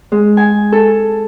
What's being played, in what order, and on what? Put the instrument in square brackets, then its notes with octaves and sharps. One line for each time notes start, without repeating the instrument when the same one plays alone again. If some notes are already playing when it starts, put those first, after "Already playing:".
[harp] G#3
G#5
A4